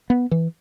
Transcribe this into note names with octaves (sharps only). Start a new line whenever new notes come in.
B3
E3